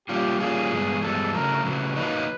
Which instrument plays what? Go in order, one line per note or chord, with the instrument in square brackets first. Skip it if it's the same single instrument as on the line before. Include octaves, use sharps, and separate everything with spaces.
[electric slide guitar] G3 A#3 C#4 F4 [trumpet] G4
[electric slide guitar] G3 A#3 C#4 F4 [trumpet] G#4
[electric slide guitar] G2 E3 G#3 B3
[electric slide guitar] G2 E3 G#3 B3 [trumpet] A4
[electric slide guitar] C#3 F#3 A3 [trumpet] A#4
[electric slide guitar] C#3 F#3 A3 [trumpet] B4
[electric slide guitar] D#3 F#3 A#3 D#4